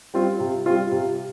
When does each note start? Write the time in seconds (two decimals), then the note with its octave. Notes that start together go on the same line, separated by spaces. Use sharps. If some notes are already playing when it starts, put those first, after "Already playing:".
0.14 G3 C4 F4
0.40 C3
0.66 G3 C4 F4
0.92 C3